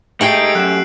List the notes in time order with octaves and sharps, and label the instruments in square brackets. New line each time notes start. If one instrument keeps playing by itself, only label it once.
[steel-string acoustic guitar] A3 G4 G5 [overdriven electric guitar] D#4 G#4 [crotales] C7 D7 F#7
[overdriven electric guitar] F#2 [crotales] F#6 E7